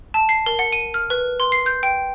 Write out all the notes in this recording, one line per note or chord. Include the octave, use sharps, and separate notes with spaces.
A5
C7
A#4
F#5
D#7
F6
B4
C6
C7
G6
G5